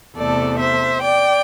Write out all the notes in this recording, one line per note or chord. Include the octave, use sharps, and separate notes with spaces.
E2 C3 A3 A4 D5
C5 E5
D5 G5